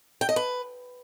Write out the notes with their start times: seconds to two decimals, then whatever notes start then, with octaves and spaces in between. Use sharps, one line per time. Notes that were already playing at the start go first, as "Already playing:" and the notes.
0.21 G5
0.29 D#5
0.36 B4